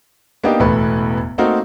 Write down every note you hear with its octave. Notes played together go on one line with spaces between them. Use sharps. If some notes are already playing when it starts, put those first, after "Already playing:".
A#3 B3 D4 D#4 G4
E1 E2 A2 A3 B4
A3 A#3 C4 D#4 F#4 A#4